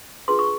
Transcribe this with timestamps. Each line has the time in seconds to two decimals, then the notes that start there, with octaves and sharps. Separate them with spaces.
0.28 D4 F4 G#4 B4 C6
0.39 C#6